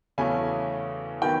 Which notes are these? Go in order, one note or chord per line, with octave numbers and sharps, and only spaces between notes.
E2 C#3 F#3 A3 C#4 G#5
D#3 F#3 B3 G5